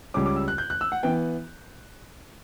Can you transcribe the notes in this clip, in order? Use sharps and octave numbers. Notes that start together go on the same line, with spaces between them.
C#2 C#3 G3 C#4 D6
D6
E6
F#6
G6
F#6
E6
F#5
E3 B3 G5